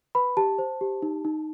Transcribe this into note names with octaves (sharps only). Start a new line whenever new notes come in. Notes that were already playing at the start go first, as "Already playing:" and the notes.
B4 B5
G4 A5
C5
G4
D#4
D#4